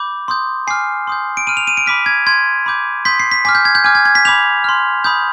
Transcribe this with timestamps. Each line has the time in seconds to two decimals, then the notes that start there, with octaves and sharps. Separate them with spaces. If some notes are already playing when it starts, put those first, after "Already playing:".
Already playing: B5 D6 G6
0.28 C6 D#6 G6
0.67 G#5 D6 F6 C7
1.07 C6 D#6 G6
1.37 D7
1.47 B5 F6 D#7
1.57 F7
1.67 D#7
1.77 D7
1.86 B5 D6 F6 B6
2.06 G#6
2.27 C6 G6 G#6
2.66 B5 D6 G6
3.05 C6 D#6 G6 B6
3.20 C7
3.32 B6
3.45 G#5 D6 F6 B6
3.55 G6
3.65 G#6
3.75 G6
3.84 G#5 D6 F6 G#6
3.95 G#6
4.05 G#6
4.15 B6
4.25 B5 D6 G6 F7
4.64 C6 F6
5.04 B5 D#6 G6